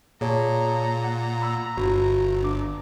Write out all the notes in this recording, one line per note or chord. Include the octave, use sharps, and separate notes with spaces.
A#2 G#4 C#5 A5 A#5
F#5
B5 E6
G1 F#4
D4 D6